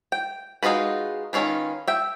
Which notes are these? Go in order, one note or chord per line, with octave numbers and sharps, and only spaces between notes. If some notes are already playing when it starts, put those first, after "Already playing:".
G5
G#3 D#4 F4 F#4 B4
D#3 E3 C#4 F4 B4
E5 G5